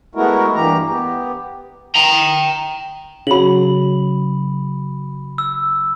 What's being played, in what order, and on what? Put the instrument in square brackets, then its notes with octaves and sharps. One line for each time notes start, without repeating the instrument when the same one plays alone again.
[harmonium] G#3 A3 B3 E4 F#4 A#4
G2 E3 A#3 G4 A#5
B3 G4
[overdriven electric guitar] G5 A#5
[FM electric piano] C#3 F#3 [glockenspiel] B5 F#7
[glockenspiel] E6